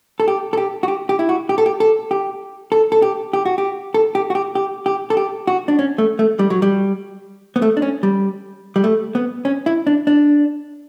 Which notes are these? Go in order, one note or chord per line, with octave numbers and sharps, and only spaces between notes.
A4
G4
A4
G4
F#4
G4
G4
E4
F#4
G4
A4
G4
A4
G4
A4
A4
G4
G4
F#4
G4
A4
G4
F#4
G4
G4
G4
A4
G4
F#4
D4
C#4
A3
A3
G3
F#3
G3
B3
A3
D4
C#4
G3
G3
A3
B3
C#4
E4
D4
D4